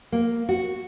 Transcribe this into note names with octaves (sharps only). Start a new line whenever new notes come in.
A#3
F#4